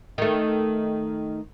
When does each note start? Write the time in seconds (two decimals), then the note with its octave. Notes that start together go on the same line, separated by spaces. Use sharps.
0.18 D#3 A3